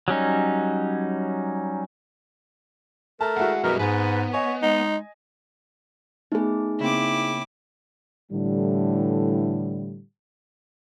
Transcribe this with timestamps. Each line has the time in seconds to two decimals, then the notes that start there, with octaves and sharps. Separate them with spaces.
0.08 F#3 G3 C#4 D#4
3.21 A3 A#4 A5
3.37 G#3 E4 F#4 D5 F#5
3.64 F#2 B2 G3 A#4
3.79 G#2 B3 G#4 B4
4.33 C#5 D#5 G#5
4.62 G#3 D#4
6.32 A3 B3 D#4 G#4
6.80 C#3 A#3 C4 E4 D6
8.32 A2 D3 E3 G3